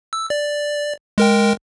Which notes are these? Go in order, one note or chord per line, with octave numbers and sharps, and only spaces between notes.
E6
D5
G#3 A#4 G5